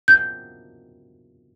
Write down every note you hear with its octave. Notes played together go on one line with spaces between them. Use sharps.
G6